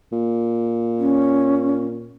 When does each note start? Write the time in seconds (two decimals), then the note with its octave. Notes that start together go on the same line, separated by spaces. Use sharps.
0.12 A#2
0.98 C#4